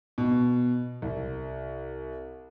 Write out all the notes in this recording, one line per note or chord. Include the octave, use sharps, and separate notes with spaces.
B2
C2